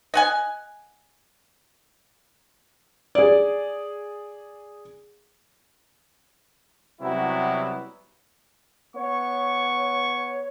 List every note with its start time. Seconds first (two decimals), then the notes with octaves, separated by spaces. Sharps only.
0.14 D#5 F#5 G#5
3.15 G#4 D5
7.01 C3 F#3 G3 B3 E4 F#4
8.96 B3 C#5 C#6